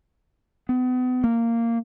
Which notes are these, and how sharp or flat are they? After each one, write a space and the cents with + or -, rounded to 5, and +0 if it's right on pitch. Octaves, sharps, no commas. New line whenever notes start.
B3 +35
A#3 -10